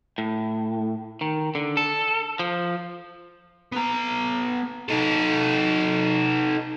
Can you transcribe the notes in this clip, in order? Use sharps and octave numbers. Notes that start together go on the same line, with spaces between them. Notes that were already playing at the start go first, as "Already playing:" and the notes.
A2
D#3
D3
A4
F3
B3 A#5
D#4 A4